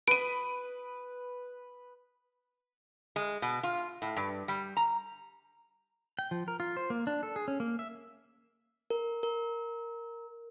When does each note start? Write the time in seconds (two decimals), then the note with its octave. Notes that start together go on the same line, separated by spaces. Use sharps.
0.08 B4 D#6 D7 D#7
3.16 G#3
3.42 B2
3.63 F4
4.02 A2
4.16 G2
4.48 G3
4.77 A#5
6.19 G5
6.31 F3
6.48 A#4
6.60 F4
6.77 C5
6.90 A#3
7.07 D4
7.23 A4
7.36 G#4
7.48 C#4
7.60 A#3
7.79 E5
8.90 A#4
9.23 A#4